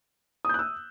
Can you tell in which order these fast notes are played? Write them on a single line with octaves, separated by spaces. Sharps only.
D#6 G6 F#6 E6